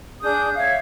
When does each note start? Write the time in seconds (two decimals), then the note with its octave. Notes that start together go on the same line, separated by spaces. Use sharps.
0.22 D4 G#4 D#6 G6
0.55 C#5 E5 F5